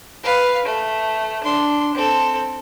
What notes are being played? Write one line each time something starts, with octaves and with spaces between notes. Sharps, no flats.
B4 F5
A3
D4 C6
C4 A4